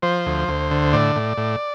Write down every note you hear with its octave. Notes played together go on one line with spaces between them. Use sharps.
F3 C5
D2
D2
D3
A2 D5
A2
A2